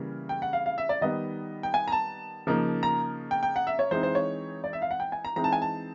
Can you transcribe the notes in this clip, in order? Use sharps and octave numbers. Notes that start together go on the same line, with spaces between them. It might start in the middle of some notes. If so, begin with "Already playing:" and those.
Already playing: C#3 E3 G3 A#3
G5
F#5
F5
F5
E5
D5
D#3 G3 B3 D#5
G5
G#5
A#5
A5
C#3 F3 A#3 D#4
A#5
G5
G5
F#5
E5
C#5
E3 G#3 C4 D#4 C5
C5
C#5
D5
E5
F5
F#5
G5
G#5
A#5
E3 G#3 C4 D#4 A#5
A5
G#5
A5